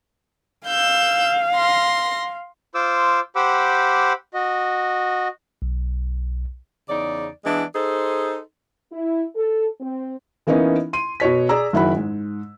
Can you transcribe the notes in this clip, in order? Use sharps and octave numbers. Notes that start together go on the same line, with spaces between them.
F5 E6 G6
C6 A#6
F4 C5 D6 E6
G4 C5 F#5 B5 D6 E6
F#4 D#5
B1
E2 C#3 D#4 D5
E3 G#3 B3 D4 E4
D#4 G#4 A4 C5
E4
A4
C4
E3 A#3 B3 C#4 D#4 E4
C6 D#7
B2 F#4 C#5 B6
G#4 D5 A#5 E6
F#1 D#3 E4 F#4 F#5 B5
G#2